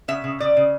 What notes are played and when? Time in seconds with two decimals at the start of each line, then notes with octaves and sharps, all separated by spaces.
0.08 C#3 E5
0.24 C#3
0.40 C#3 D5
0.57 C#3